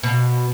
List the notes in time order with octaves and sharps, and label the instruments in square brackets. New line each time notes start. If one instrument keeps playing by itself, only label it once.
[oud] B2